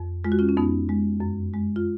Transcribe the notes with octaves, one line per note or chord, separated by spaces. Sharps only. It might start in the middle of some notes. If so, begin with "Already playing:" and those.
Already playing: F2
G#3 F4
F#4
C#4 F4
C#4
F2 B3 D#4
G#3
F#2
G#3
F4